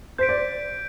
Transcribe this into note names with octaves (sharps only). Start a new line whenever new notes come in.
C5 G6 B6 D7
D5